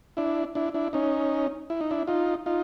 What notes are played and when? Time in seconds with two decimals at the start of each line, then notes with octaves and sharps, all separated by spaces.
0.17 D4 E4
0.55 D4 E4
0.74 D4 E4
0.93 C#4 D#4
1.70 E4
1.81 D#4
1.91 D4 E4
2.07 D#4 F4
2.46 D#4 F4